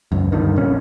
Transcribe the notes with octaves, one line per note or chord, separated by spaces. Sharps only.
C#2 F#2
G2 D3 D#3
A#1 F2 C#4